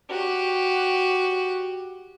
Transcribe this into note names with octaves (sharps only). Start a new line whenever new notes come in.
F#4 G4